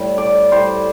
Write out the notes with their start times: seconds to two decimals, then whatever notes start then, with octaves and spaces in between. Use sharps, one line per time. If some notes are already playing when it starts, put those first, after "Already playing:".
Already playing: A2 G3
0.18 D5
0.52 A2 G3 C5